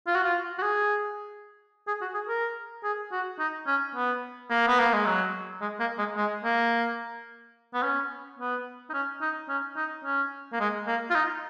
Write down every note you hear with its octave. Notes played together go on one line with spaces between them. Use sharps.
F4
F#4
F4
F#4
G#4
G#4
F#4
G#4
A#4
G#4
F#4
D#4
C#4
B3
A#3
B3
A#3
G#3
F#3
G#3
A#3
G#3
G#3
A#3
B3
C#4
B3
D#4
C#4
D#4
C#4
D#4
C#4
A#3
G#3
A#3
F4
D#4